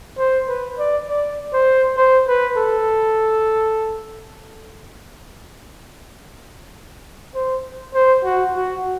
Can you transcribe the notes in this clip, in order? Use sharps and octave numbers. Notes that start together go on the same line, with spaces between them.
C5
B4
D5
D5
C5
C5
B4
A4
C5
C5
F#4
F#4